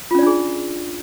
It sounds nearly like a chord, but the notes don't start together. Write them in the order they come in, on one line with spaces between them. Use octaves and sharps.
F4 C#4 D5 D4 G#4